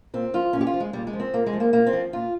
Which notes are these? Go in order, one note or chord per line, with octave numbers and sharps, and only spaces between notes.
A#2 C4
F3 F4
A#2 C#4
G4
F4
F3
G#3
A#2 G3
G#3
F3
C4
A#2 A#3
G#3
F3
A#3
A#2 A#3
C4
F3
A#2 F4